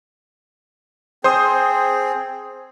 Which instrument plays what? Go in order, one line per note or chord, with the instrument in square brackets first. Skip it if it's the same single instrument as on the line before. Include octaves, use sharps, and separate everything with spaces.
[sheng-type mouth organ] C4 G#4 [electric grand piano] C5 C6 D#6